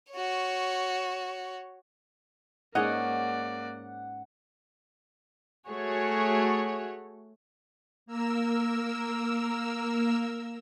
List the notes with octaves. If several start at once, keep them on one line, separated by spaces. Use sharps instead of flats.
F#4 C#5
G#2 A#3 C#4 D5 D#5 F#5
A3 F#4 G#4 C#5
A#3 A#4 E6